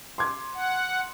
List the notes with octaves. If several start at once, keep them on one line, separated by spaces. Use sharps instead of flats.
C6 D6 G#6
F#5